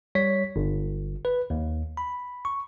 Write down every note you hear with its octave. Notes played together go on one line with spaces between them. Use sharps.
G3 C#5 B6
G1
B4
D#2
B5
C#6